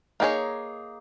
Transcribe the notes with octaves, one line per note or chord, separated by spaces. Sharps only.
A#3 D#4 G#4 C#5